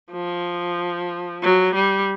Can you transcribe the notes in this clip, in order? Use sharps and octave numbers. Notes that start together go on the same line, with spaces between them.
F3
F#3
G3